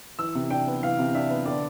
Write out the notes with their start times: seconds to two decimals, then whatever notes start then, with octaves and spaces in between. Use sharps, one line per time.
0.19 E3 E6
0.35 C3
0.50 D4 G5
0.67 B3
0.82 E3 F5
0.99 C3
1.15 D4 E5
1.30 B3
1.46 D3 D5